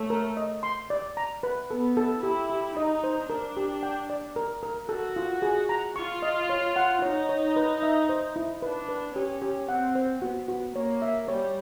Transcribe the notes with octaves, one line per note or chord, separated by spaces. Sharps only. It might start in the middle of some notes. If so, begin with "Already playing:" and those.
Already playing: A3 C#5
A#4
D#5
C6
D5
A#5
B4
B3 A4
A4
E4 G4
G4
D#4 D#5
C5
D4 A#4
G4
G5
D5
A#4
A#4
F#4 A4
F4
G#4
A#5
F4 C#6
D#5
C#5
F#5
D#4 C#5
C#5
B4
E5
C5
E4
D4 B4
B4
C#4 G4
G4
C4 F#5
C5
B3 F#4
F#4
A#3 C#5
E5
G3 C#5